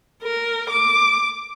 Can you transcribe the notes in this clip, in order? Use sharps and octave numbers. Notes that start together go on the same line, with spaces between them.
A#4
D6